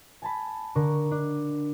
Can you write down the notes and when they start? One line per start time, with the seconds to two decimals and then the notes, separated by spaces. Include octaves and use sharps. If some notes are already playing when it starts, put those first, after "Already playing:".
0.22 G#5 A5 B5
0.75 D3 A#4 C#6
1.11 D4